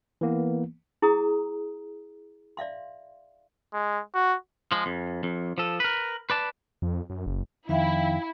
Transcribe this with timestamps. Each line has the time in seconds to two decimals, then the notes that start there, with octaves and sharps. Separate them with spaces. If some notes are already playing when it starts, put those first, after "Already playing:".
0.21 E3 A#3 B3
1.02 E4 G#4 A#5 D#6
2.57 D5 E5 F5 C6
3.74 G#3
4.15 F#4
4.72 F3 G#3
4.86 F2
5.23 F2
5.58 F3 A4
5.80 A#4 B4
6.30 B4 D5 A5
6.82 F2
7.10 F#2
7.26 F#1
7.69 F2 D#3 E4 E5 F5 G5